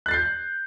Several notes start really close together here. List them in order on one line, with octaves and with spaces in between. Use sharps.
F#6 A6 C7 G6